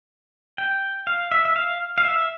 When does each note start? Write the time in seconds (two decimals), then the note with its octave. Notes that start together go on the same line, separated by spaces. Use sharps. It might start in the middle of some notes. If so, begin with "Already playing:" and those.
0.58 G5
1.07 F5
1.32 E5
1.45 E5
1.56 F5
1.98 F5
2.05 E5